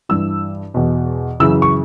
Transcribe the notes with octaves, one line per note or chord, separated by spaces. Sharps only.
G2 E3 E6
E2 B2
F#2 C#3 E3 E6
C#6